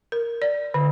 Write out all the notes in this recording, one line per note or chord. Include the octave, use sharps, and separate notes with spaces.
A#4
D5
D3